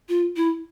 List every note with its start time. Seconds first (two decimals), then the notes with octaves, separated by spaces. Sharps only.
0.09 F4
0.36 E4